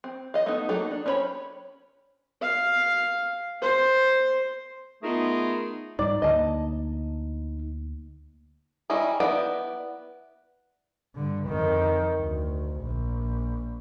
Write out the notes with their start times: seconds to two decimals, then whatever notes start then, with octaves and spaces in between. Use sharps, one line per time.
0.04 C4
0.34 D#5 F5
0.46 A3 B3 D#4
0.69 F#3 A#3 D#4 A4
0.91 D4
1.06 C#4 D4 C5 C#5 B5
2.41 F5
3.62 C5
5.03 A3 B3 D#4 F4 G#4 A#4
5.99 G#2 G3 D#4 D5
6.22 D2 D3 A#3 D#5 A5
8.90 G3 C#4 D#4 E4 G#4
9.20 B3 E4 D5 D#5 G5
11.15 G2 D3
11.48 F2 D#3
12.20 D2
12.81 A#1